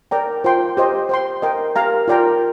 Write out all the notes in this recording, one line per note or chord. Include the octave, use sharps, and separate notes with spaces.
A#4 D5 G5 A#5
F4 C5 G5 C6
G4 C5 D#5
C5 G5 C6
A#4 D#5 G5
G4 A#4 F5 A#5
F4 A#4 D5 G5 A#5